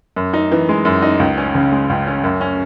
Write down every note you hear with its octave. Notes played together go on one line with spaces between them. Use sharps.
F#2
D#4
E3
G#3
F#2
D#4
C#2
C#4
C#3
G#3
C#2
C#4
F#2
C#4